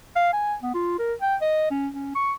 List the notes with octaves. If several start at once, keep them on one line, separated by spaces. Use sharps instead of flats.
F5
G#5
B3
F4
A#4
G5
D#5
C#4
C#4
C#6